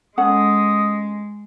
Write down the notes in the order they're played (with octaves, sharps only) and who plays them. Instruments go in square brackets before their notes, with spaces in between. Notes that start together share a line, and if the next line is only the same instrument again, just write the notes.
[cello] G#3 [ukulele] C#4 A4 F#5 [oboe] D#6